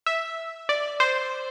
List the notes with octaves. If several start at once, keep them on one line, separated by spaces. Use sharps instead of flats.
E5
D5
C5